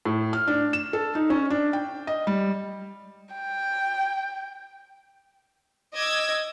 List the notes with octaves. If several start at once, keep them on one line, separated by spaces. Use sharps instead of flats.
A2
F6
D4
E7
A4
D#4
C#4
D4
G5
D#5
G3
G5
D#5 D6 E6 G#6